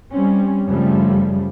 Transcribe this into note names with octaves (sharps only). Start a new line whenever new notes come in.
G3 C4 C#4
F#2 C#3 F3 G3 A3